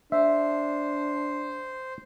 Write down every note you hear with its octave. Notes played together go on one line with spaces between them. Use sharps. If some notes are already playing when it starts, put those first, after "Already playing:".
D4 C5 E5